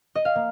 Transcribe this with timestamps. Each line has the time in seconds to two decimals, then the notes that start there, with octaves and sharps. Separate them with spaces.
0.15 D#5
0.25 F5
0.36 A#3